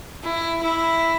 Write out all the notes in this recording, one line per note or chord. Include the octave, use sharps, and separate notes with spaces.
E4
E4